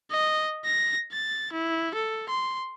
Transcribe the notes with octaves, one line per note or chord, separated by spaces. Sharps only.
D#5
A#6
A6
E4
A4
C6